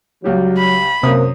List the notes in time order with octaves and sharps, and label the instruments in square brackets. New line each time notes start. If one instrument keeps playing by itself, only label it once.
[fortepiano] C#2 G3 G4 [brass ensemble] F#3
[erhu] B5
[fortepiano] F#2 D#6 [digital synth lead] C3 [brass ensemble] A#3